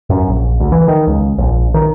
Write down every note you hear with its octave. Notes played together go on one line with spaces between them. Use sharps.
F#2
A#1
D2
E3
D#3
C#2
A#1
D#3